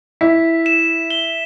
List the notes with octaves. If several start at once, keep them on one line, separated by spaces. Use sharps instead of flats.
E4 B6
E7
G7